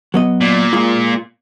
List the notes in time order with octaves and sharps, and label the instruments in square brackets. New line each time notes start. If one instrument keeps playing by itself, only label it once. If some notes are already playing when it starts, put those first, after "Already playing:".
[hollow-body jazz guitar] F#3 B3 D#5
[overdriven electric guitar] A#2
[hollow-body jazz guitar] G#3 F4